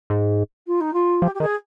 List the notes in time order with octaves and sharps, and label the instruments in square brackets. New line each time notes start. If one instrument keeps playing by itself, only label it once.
[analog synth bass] G#2
[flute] F4
D#4
F4
[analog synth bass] F3 [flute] G4
[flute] G4
[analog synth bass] D#3 [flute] G#4